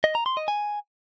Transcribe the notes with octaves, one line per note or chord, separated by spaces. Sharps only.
D#5
A#5
C6
D#5
G#5